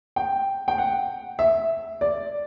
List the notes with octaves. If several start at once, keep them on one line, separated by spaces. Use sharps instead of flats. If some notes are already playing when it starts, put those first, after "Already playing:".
G5
G5
F#5
E5
D5